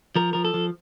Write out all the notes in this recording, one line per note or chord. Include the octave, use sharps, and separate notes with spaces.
F3 A#4
F3 A#4
A4
F3